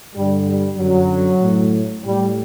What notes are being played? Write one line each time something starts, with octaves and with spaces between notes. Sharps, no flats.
G2 D3 G3
G3
F#2 D3 F#3
A2
A2 G3